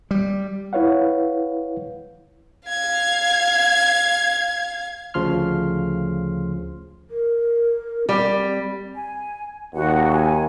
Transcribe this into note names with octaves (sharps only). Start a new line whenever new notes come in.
G3
E4 B4 C#5 F5 F#5
F5 G#6
D2 C#3 F3 C6 F6
A#4
G3 C4
G#5
D#2 F#4 F#5
G#5